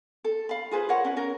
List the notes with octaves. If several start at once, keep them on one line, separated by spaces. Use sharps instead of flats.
A4
F5 B5
F4 G#4 B4 C5
A#4 C#5 F#5
C#4 B4
C#4 A#4